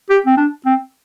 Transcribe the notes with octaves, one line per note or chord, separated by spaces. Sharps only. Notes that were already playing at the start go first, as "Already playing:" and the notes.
G4
C4
D4
C4